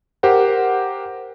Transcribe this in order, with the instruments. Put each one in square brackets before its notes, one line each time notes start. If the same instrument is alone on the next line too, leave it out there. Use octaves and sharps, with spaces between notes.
[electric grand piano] G4 A#4 C5 F#5